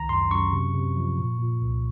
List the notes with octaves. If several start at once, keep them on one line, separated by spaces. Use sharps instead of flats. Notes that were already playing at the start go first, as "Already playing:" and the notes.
Already playing: C#2 D#3 A#5
F#2 C6
F#2 C#6
C3
C3
F3
A#2
A#2
C2